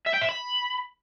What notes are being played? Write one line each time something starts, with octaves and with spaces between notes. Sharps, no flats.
E5
G5
E5
B5